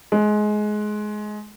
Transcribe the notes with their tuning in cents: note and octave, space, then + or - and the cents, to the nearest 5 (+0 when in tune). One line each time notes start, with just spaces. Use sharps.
G#3 +20